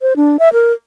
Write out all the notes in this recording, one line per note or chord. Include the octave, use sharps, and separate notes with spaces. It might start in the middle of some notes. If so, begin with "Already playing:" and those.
C5
D4
E5
A#4